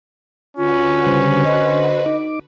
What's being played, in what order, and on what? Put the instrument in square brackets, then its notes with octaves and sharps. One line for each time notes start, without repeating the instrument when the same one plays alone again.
[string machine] D3 F#4 B4 [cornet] C#4 [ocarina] F4
[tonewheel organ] C#3 G3 C5
[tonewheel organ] C5 [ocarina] D#5
[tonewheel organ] D#4 D6